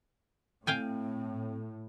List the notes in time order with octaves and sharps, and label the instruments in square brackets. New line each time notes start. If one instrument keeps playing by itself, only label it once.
[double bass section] A2 [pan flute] C4 [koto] F5 G5 G#5